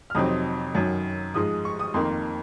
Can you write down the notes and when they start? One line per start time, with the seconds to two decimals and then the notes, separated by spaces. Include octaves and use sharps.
0.10 F6
0.15 F2 C3 F#3 C4 D#4 D#6
0.75 F#2 D#3 F#3
1.34 G#2 F3 G#3 D#6
1.65 C#6
1.79 D#6
1.94 F2 D#3 A#3 C6